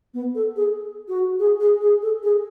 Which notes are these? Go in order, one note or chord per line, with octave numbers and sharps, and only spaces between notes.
B3
A4
G#4
F#4
G#4
G#4
G#4
A4
G#4